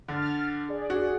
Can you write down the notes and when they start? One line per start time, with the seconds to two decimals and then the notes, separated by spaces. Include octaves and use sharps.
0.08 D3 F6 A6
0.68 G#4 D5
0.90 F#4